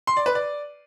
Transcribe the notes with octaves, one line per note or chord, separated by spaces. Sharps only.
C6
D5
B4
D5